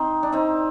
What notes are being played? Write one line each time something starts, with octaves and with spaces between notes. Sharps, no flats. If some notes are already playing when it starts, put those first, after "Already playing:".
Already playing: C4 D#4
D4
C4 D#4